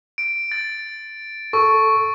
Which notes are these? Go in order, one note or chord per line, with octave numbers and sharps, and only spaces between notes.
D7
A6
A4 C#6